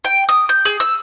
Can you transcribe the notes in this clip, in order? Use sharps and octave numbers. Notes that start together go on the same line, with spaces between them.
G5
D#6
G6
G#4
E6